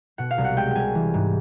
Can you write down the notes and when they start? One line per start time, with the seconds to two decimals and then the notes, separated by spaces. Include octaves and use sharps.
0.18 B2 F#5
0.31 F5
0.38 C2
0.44 F#5
0.57 G#3 G5
0.75 C2 G#5
0.95 E3
1.14 G#2